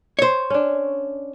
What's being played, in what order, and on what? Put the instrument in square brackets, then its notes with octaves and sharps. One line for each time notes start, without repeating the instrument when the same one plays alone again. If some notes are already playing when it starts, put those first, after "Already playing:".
[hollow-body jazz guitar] C5 C#5
[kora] C#4 D4